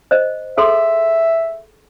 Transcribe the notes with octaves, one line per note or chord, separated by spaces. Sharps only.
C5 D#5
G#4 A4 E5 C6